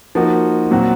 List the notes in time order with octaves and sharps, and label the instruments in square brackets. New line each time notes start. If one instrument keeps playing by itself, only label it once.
[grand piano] F3 A#3 D#4 F#4
A#2 F#3 C4 F#4